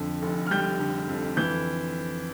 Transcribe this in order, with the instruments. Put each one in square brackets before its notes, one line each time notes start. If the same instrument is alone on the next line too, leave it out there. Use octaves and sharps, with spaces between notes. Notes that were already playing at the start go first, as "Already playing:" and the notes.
Already playing: [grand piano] F2 D3
F1
F6
G3 G6
D3
F2
E3 G6